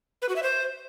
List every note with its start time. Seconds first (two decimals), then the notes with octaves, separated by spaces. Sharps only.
0.22 B4
0.29 F#4
0.36 E5
0.43 C5